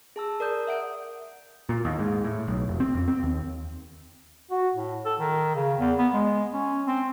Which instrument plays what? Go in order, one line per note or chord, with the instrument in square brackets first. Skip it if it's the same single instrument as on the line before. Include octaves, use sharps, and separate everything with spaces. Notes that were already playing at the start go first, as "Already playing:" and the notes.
[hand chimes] G#4 A5 E6
A#4 D5 D#6 G6
E5 F#5 D7
[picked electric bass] A#2
D#2
G#2
A2
B1
F1
C4
F2
C4
D#2
[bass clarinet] F#4
A2
A4
D#3
C#3
E2
B3
G#3
C#4
C4